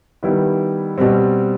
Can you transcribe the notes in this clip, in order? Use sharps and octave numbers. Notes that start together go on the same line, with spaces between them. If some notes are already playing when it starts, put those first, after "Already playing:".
D#3 G3 B3 E4
B2 G3 C4